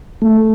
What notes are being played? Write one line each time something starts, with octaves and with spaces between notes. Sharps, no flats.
A3